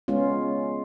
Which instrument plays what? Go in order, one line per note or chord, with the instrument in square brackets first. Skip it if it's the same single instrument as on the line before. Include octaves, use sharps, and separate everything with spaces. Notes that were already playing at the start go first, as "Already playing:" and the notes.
[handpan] G#3 B3 C#4 F4